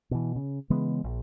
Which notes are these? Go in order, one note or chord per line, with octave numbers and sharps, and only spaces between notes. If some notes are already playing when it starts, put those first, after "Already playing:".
B2 E3
C#3
C#3 E3 G#3 B3
A#1